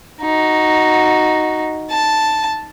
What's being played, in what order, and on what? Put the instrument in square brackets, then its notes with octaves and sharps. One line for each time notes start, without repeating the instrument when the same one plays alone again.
[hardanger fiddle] D#4 F#4
A5